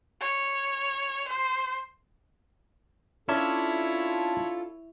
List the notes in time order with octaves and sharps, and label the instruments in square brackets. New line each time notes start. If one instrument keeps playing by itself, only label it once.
[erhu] C#5
C5
[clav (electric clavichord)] C#4 E5 [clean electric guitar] D4 [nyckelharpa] E4 C#5 [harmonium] F4 A4